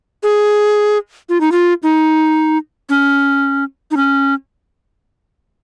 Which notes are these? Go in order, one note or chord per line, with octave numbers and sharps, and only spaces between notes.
G#4
F4
D#4
F4
D#4
C#4
D#4
C#4